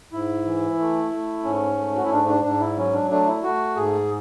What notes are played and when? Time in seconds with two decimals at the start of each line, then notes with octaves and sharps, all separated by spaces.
0.13 G#2 E4
0.45 E3
0.79 A3
1.12 A3
1.44 G#2 C#4
1.77 A3
1.96 F#4
2.03 E4
2.11 G#2 D4
2.28 D4
2.44 G#2 D4
2.60 E4
2.77 F#3 C#4
2.94 D4
3.10 A3 D4
3.27 E4
3.43 A3 F#4
3.76 G#2 G#4